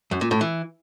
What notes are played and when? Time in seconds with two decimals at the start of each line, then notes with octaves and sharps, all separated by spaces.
0.11 F#2
0.21 A#2
0.31 A2
0.41 E3